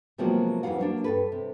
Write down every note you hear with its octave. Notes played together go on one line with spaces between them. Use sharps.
C3 F3 F#3 G#3 A#3 B3
F2 E3 G3 F4 F5 F#5
F#3 G3 A#3 D4
G2 A4 B4
C3